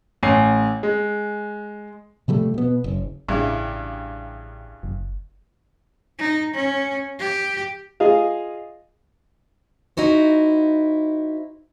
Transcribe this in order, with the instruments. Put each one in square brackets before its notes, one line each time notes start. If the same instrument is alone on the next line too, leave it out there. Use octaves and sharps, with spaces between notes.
[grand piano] A1 G#5 C7
G#3
[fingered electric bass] C3 F3 G3 A3
B2 B3
F#1
[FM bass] A1 [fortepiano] G2 C#3 E4
[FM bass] F#1
[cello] D#4
C#4
G4
[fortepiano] F4 G#4 D#5 F5
[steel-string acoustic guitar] D#4 E4 F#4 C5